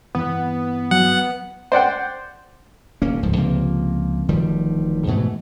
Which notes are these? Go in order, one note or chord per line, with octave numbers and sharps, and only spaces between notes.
G2 E3 B3 C4
F#3 F#5
C5 D5 F#5 G5
D#1 A#3 C#4
D1 C#2 G#2 F3
C#2 C3 F3 A#3
D1 D#3 F3 G3
G#2 B2 E3 A3